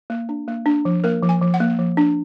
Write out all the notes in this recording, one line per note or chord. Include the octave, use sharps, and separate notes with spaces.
A#3
D4
A#3
D4
F3
A#3 A#4
F3
G#5
F3
F#5
A#3
F3
D4